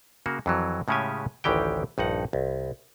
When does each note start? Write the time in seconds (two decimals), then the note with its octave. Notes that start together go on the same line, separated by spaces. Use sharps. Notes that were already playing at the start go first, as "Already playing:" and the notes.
0.26 C#3 A#3 F#4
0.46 F2 E3 F#3
0.88 A2 C#3 G#3 C#4 G4 G#5
1.44 A1 D2 D#3 E3 G4 G5
1.98 A#1 G2 D#4 F#5
2.33 C2